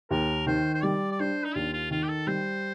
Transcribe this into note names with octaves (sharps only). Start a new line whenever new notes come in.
D#2 A#4
D#3 C5
C5
G3 D5
D5
D4 C5
D#4
D#2 F4
F4
D#3 F4
G4
A4
G3 C5